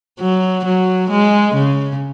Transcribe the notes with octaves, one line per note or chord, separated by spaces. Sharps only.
F#3
F#3
G#3
C#3